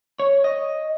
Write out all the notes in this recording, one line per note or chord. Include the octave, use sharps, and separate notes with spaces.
C#5
D#5